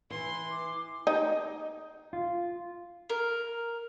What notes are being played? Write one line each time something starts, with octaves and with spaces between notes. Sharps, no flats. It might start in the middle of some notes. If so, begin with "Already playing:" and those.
E3 C6
D6
D#4
F4
A#4